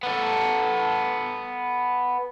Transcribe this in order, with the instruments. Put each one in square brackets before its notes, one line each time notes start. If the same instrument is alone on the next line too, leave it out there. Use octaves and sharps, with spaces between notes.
[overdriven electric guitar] B3 A4